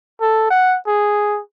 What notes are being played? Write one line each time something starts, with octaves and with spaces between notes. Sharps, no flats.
A4
F#5
G#4